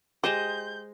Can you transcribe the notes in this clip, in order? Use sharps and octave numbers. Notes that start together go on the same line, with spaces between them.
G#3 G4 C5 D#5 G6